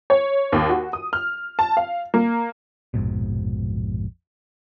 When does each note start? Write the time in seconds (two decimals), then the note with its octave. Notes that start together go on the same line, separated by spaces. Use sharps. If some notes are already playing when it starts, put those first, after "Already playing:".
0.10 C#5
0.52 D#2
0.69 F#4
0.93 D#6
1.13 F6
1.59 A5
1.77 F5
2.14 A#3
2.94 A#1 F2 G#2 B2